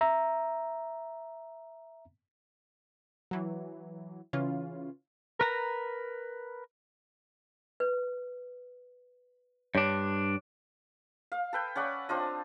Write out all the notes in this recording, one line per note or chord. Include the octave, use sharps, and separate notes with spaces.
E5 A#5
E3 F#3
C#3 E3 C#4 F4
A#4 B4 A#5
B4
G2 D4 C#5
F5
A4 B4 G5
C#4 D5 F#5 B5
C4 D4 F4 D#5